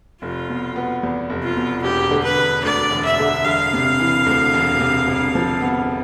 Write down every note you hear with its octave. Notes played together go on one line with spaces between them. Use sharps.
F1 F4
B2
B3
E2
F1
F4
B2
E1 G4
D3
B4
E1
D2 D5
E1
E5
D3
E1 F5
C3
E3
D2
E1
C3
G1
F3
B3